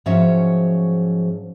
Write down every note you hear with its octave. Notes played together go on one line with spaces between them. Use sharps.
G#2 F3 F#3 C#4 E5